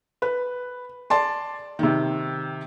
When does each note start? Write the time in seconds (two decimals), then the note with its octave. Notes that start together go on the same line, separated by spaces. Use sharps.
0.22 B4
1.10 D5 A5 C6
1.79 C3 D#3